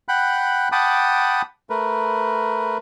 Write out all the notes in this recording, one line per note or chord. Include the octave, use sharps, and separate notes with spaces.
F#5 G5 B5 F#6
F#5 G5 A5 B5 D6 D#6
A3 A#4 B4